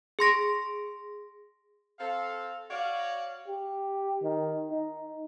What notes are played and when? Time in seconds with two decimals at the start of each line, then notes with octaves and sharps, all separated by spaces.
0.19 G#4 C6 A#6 D7
2.00 C4 A4 F5
2.70 F#4 C#5 D5 F5
3.47 G4
4.22 D#3
4.71 D#4